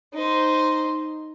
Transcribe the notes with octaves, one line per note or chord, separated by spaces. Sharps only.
D#4 C5